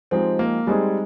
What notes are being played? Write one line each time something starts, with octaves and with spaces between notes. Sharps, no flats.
F3 G#3 C4 D#4 G4
A#3
G3 G#3 C4 D#4 G#4